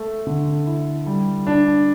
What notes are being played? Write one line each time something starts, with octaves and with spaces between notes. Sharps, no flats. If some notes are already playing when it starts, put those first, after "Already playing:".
Already playing: A3 A4
D3
E4
G3
D4